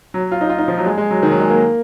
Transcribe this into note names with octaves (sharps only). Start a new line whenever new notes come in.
F#3
F4
D#4
F4
D#4
F3
F#3
G#3
G#3
F#3
D#3
F#3
G#3
A#3